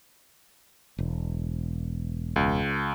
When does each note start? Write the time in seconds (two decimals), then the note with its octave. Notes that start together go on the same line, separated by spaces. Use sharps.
0.98 E1
2.36 C#2